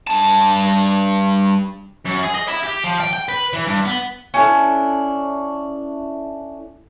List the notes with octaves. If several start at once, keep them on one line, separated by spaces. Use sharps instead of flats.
G2 A5
F#2
G#4
D#5
E4
G4
F3
G5
G5
B4
E3
G2
B3
C#4 D4 E4 A4